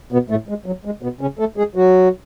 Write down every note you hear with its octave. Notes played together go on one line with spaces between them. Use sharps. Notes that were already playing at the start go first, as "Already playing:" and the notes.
B2 B3
A2 A3
G#3
F#3
G#3
B2 B3
C#3 C#4
A3 A4
G#3 G#4
F#3 F#4